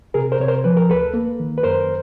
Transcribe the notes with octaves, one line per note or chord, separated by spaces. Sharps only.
C3 G#4 A#4
A#4 C5
C3 C#5
A#4 C5
F3 B4
A#4
D2 A4 B4
A#3
D#3
B4
F#2 A#4 C5